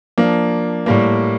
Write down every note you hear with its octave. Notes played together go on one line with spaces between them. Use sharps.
F3 A#3 D4
A2 G3 A#3